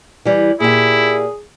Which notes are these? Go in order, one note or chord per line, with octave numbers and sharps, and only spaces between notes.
E3 G3
A#2 E4 G4 G#4